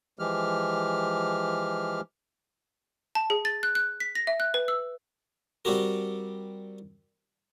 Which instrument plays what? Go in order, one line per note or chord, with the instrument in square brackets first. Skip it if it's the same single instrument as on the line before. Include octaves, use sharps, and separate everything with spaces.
[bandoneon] E3 F3 G#3 G4 F6
[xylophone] A5
G#4
A6
F#6
F#6
B6
A#6
E5
F#6
B4
E6
[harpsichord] G3 C4 F#4 G4 A#4